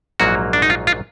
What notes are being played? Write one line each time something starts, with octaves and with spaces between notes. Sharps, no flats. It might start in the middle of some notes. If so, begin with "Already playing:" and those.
A#1 G#2 F#3 A#3 F#4
D4
D#4
F4
F4